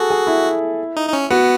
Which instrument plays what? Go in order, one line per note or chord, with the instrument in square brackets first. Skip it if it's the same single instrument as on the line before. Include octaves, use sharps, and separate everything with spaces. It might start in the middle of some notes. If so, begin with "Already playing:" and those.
Already playing: [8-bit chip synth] F#4 [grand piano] G#4 A4
[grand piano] G#4
E4
[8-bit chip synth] D#4
D#4
C#4
[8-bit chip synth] B3 [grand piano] F#4